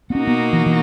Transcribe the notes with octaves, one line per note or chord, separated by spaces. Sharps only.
B3
B2 A#3 C#4 D#4 F#4
B3
E3
E3